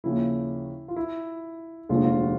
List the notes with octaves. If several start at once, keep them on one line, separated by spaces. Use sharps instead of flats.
D#2 C#3 F3 E4
F4
E4
F1 D#2 D3 F3 G#3 F4
F4
F#4